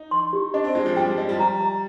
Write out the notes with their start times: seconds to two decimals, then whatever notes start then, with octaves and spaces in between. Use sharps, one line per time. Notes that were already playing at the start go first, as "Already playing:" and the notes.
Already playing: D#4
0.11 C6
0.33 G4
0.54 D4 D#5
0.64 C4
0.75 G#3 F4
0.86 F3
0.96 G3 G5
1.07 G3
1.18 F3 D#5
1.29 G3
1.39 A#5
1.61 A#5